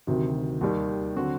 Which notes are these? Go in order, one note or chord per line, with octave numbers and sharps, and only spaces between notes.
D2 C3 D#3 F#3
D#2 D#3 G3
D3 F#3 C4 F#4